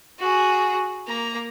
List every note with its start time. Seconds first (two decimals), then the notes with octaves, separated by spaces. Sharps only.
0.19 F#4 G#4
1.07 A#3 A#5